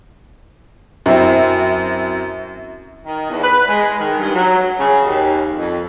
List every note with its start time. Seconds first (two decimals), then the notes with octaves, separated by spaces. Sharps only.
1.06 F#2 C4 E4
3.05 D#3
3.30 E2
3.43 B4
3.68 G#3
3.99 D#3
4.18 G2
4.34 F#3
4.79 C#3
5.04 D#2
5.55 F2